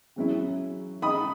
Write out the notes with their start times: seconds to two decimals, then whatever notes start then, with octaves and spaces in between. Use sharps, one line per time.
0.16 C#3 F#3 C#4 E4
1.02 C#3 G#3 D#4 B5 D#6